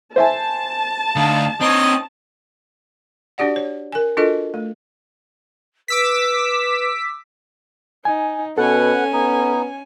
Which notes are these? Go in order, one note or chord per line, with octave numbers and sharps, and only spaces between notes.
C5 E5 G#5 A5
D2 D#4 F5
C4 D#4 C#5 D#5 D#6
D4 F#4 G4 D5 F#5
C#5
A#4 G#5
D4 F4 F#4 A4 A#4 D#5
A3
B4 D6 E6 B6
D#4 G#5
B2 B3 C#4 A4 F#5 G#5
B3 D#4